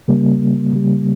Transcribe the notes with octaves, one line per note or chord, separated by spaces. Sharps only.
C#3 G3 A#3
C#3 G3